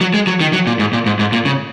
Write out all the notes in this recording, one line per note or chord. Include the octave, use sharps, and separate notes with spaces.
F#3
G#3
F#3
D#3
F#3
A#2
G#2
A#2
G#2
G#2
A#2
C#3